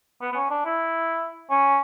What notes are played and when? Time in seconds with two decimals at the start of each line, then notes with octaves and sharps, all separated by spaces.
0.21 B3
0.32 B3
0.35 C#4
0.50 D4
0.65 E4
1.50 C#4